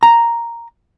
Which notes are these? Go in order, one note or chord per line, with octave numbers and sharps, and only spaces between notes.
A#5